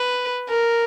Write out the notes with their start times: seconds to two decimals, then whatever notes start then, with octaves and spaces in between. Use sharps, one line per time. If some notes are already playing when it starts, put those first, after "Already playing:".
Already playing: B4
0.49 A#4